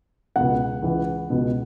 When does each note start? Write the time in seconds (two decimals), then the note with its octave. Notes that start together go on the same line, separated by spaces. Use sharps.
0.36 C#2 B2 F#5
0.82 C#2 C#3 E3
1.30 C#2 B2